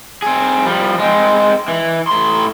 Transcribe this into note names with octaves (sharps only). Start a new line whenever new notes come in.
C4 G#4
F3 G3
G#3 C4
E3
A2 C6